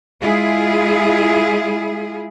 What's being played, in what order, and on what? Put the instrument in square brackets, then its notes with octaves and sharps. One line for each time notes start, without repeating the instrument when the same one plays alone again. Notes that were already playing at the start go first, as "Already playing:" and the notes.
[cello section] G#3 E4 F4 G#4